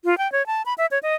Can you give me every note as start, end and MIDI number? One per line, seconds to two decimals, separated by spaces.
0.05 0.18 65
0.18 0.30 79
0.32 0.46 73
0.47 0.62 81
0.66 0.74 83
0.78 0.86 76
0.91 0.99 73
1.03 1.15 75